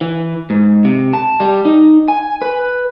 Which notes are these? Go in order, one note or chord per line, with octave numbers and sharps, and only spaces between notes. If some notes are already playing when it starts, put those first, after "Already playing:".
E3
G#2
C3
A5
G3
D#4
G#5
B4